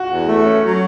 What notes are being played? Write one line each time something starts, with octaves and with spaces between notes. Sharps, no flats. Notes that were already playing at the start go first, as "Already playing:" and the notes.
Already playing: F#4
E2
A3
C#4
F#3